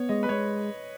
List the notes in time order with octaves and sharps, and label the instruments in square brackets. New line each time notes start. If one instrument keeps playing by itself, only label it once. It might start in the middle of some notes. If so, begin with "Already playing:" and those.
Already playing: [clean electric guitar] B3 [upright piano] C#5
[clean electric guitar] G#3 [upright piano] D#5
[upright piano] B4
[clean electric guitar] G#3 [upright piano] C#5